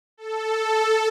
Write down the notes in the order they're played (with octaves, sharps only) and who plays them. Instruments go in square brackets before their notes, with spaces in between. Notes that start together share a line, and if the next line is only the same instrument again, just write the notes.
[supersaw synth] A4